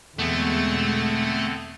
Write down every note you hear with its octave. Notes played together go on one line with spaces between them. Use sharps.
E2 B2 D3 G#3 A3 B3 C4